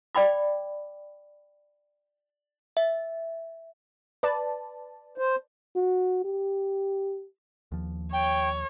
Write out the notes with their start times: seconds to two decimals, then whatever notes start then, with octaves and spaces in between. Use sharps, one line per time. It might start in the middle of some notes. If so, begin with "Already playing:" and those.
0.15 D5 G5 B5 D6
2.77 E5
4.23 B4 D5 A5
5.18 C5
5.76 F#4
6.24 G4
7.72 D#2 F3
8.13 C#5 G5